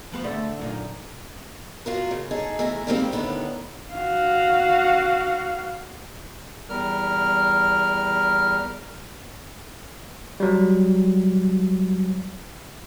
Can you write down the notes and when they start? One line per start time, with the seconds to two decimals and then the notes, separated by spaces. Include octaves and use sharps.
0.12 F3 B3 C5
0.24 D3 A3 A4
0.59 F#2 A#2 D#4
1.86 F4 F#4 A#4
2.11 C#3
2.31 D#4 G#4 A4 A5
2.59 E2 A3 G#5 A#5
2.87 D3 D#3 G3 G#3 A#3 C4
3.12 A2 D3 D#3 B3
3.94 F#4 F5
6.70 E2 G3 A#4 F6
10.40 F#3 G3